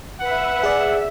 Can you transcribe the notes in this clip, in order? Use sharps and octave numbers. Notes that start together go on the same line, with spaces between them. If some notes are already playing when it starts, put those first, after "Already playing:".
B4 E5 F#5
G#4 D5 E5